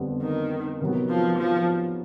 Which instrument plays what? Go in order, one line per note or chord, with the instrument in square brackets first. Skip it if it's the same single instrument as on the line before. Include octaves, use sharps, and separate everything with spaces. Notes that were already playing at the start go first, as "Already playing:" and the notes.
Already playing: [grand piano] F2 D3 G3 B3
[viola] D#3
[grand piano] C3 D#3 F#3 B3
[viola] F3
F3